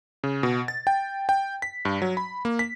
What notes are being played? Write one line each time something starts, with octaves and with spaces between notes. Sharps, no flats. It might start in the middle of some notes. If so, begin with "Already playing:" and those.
C#3
B2
A6
G5
G5
B6
G2
F#3
B5
A#3
B6